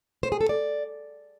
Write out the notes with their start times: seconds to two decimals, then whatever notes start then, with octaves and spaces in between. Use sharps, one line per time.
0.23 C5
0.32 G#4
0.41 A4
0.49 D5